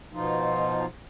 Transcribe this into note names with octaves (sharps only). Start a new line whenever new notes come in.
B2 F3 D#4 F4